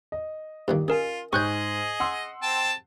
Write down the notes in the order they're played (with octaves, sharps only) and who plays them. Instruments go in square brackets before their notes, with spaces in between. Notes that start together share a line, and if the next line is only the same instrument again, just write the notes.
[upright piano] D#5
[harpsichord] G2 A#2 D#3 [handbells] G4
[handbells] C#4 A#4 G#5 [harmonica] F4 [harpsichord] G#4
[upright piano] G#2 [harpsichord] G4 C#5 [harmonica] G#4 D#5 [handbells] C#6 F#6 G6
[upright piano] F#5 C6 E6
[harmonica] C4 G5 A5